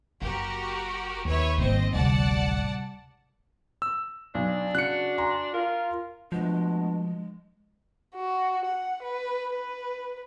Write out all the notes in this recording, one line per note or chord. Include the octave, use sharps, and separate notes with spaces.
F#1 F#4 G4 A#4
D#2 B4 C#5 E5
G#1 G#2 D#3 G3 A#3 C4 C5 D#5
D1 A1 D2 C3 G3 D5 F#5 A5
E6
B1 D4
C#3 F#4 F#6 C#7
G#5 A#5 C6
F4 A#4
B2 F3 G#3 A3 D4
F#4
F#5
B4
B4